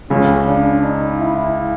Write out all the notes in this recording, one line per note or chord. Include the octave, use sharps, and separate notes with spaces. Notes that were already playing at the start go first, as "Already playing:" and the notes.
C#2 C#3 C#4
D4
D#4
E4